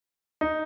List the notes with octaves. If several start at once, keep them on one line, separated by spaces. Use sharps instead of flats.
D#4